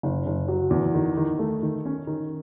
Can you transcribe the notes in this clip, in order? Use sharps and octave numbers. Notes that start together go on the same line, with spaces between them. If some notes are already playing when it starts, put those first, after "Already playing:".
F#1
F#1
F#3
E2
D#3
D#3
A3
D#3
C#4
D#3